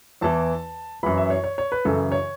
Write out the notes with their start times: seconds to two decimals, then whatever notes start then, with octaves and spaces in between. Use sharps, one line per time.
0.21 E2 E3 A5
1.03 F#2 E3 B5
1.18 E5
1.30 C#5
1.44 C#5
1.58 C#5
1.72 B4
1.85 F#2 C#3 E3 A4
2.12 C#5